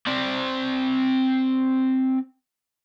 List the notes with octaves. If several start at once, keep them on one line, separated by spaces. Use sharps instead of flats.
C4 D5